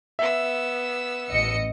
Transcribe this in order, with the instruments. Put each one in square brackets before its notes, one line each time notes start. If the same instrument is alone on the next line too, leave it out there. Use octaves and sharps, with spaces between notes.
[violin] B3 E6 [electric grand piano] E5
[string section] A1 D#5 C#7